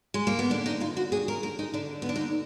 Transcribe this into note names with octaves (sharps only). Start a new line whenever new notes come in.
G#3
A#3
B3
D3 D4
D#4
D#2 F4
F#4
D#2 G#4
A#4
D3 A#4
D#4
D3 D4
B3
D#2 D4
D#4